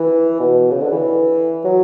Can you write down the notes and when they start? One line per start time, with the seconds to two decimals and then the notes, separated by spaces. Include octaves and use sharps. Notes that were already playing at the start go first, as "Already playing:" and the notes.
Already playing: E3
0.40 B2
0.71 C#3
0.81 D3
0.92 E3
1.64 F#3